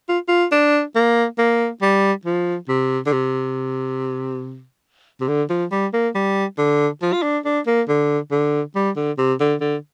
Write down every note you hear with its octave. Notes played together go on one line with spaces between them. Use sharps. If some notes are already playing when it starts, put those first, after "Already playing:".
F4
F4
D4
A#3
A#3
G3
F3
C3
D3
C3
C3
D3
F3
G3
A#3
G3
D3
F3
F4
D4
D4
A#3
D3
D3
G3
D3
C3
D3
D3